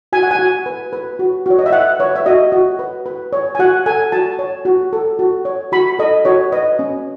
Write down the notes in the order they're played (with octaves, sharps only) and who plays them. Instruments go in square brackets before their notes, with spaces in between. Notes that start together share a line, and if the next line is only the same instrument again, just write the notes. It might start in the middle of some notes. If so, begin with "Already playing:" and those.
[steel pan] F#4 G#5
F#5
G#5
F#4
B4
B4
F#4
F#4 C#5
D#5
E5
B4 F#5
B4 C#5
E5
F#4 D#5
F#4
B4
B4
C#5
G#5
F#4 F#5
A4 G#5
F#4 A5
C#5
F#4
A4
F#4
C#5
F#4 B5
A4 D#5
F#4 C#5
B4 D#5
C#4